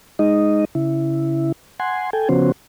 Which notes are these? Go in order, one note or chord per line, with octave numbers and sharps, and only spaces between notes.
G#3 D#4 D#5
C#3 E4
F#5 G#5 C6
A4 G5 G#5
C#3 F3 B3 C#4 F#4 C5